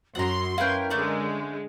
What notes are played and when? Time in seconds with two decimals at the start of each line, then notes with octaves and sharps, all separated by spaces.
0.15 F#2 F#4 F#5 A#5 C6
0.58 C#4 E4 A#4 B4 F5 G5
0.90 D3 G#3 A3 D5